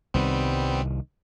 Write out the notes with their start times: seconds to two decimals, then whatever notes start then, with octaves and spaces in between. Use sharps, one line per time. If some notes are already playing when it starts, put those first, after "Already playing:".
0.14 C2 D#3 G3 B3 C4